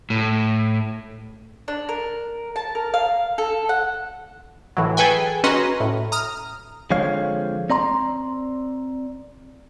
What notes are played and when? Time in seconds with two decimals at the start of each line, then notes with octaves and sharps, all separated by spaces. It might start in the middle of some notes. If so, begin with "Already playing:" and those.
0.10 A2
1.68 D4
1.89 A#4
2.56 A5
2.75 A#4
2.94 F5
3.38 A4
3.69 F#5
4.77 A2 E3 F#3
4.97 G#4 A4 B4 G5 G#5
5.44 C#4 F#4 B4 D#5 A#5 C6
5.80 A2
6.12 A#5 D#6 F6
6.90 D3 F3 G#3 C4 C#5 F5
7.70 C4 D5 A#5 C6